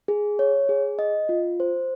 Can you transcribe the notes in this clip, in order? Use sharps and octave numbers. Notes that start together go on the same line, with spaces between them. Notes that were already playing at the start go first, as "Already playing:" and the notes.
G#4
C#5
G#4
D#5
F4
C5